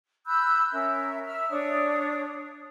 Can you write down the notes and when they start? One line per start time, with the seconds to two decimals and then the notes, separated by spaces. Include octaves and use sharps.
0.26 B5 E6 F#6 G6
0.72 C#4 A#4 E5
1.25 E5 E6 F6
1.50 D4 C#5 D5 D#6